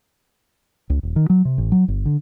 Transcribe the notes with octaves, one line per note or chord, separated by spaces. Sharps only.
C#2
D#1
D#3
F#3
C3
A1
F#3
G1
D3